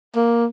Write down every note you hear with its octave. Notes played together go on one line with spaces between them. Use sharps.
A#3